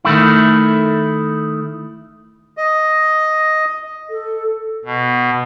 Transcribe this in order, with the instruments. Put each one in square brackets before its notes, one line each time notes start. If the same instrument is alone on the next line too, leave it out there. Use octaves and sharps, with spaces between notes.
[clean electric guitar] D#3 A3 E4
[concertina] D#5
[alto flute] A4
[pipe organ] B2